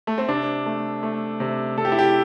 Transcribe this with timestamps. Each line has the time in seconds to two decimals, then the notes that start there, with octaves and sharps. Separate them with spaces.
0.07 A3
0.18 C4
0.28 C3 D4
0.66 A3
1.03 A3
1.40 C3
1.77 C3 A4
1.85 G4
1.92 E4
1.99 G4